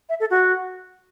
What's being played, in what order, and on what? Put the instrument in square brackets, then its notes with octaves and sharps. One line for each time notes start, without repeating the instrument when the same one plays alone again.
[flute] E5
A4
F#4